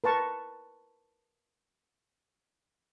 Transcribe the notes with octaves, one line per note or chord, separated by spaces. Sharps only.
A#4 B4 A5 C#6